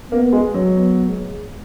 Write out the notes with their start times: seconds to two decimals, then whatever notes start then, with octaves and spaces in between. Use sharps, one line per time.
0.11 A#3 B3
0.33 G#3
0.54 F#3
0.77 B3
1.09 G#3